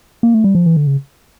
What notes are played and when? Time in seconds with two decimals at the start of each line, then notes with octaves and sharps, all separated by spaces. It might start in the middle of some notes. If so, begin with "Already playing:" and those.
0.23 A#3
0.34 A3
0.44 G3
0.55 F3
0.66 E3
0.77 D3
0.87 C#3